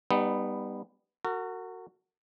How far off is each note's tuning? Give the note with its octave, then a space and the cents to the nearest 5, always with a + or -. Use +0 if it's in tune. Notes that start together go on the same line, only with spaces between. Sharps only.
G3 +20 B3 +0 D#4 -10
F#4 +0 A#4 -40